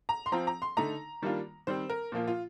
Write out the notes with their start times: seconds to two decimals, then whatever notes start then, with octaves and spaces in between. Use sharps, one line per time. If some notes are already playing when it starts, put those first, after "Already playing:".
0.09 A#5
0.26 C6
0.32 F3 C4 F4 A#5
0.47 A#5
0.62 C6
0.77 D3 A3 D#4 A#5
1.22 D#3 G3 A#3 D4 F4
1.67 D#3 G3 C4 C5
1.90 A#4
2.12 A#2 F3 A#3 F4
2.28 F4